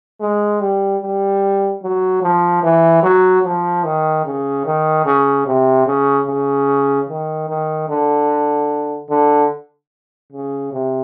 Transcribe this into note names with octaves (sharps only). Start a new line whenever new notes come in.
G#3
G3
G3
F#3
F3
E3
F#3
F3
D#3
C#3
D#3
C#3
C3
C#3
C#3
D#3
D#3
D3
D3
C#3
C3